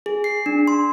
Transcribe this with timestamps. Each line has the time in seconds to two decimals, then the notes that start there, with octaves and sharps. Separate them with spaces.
0.06 G#4
0.24 C7
0.46 D4
0.67 C6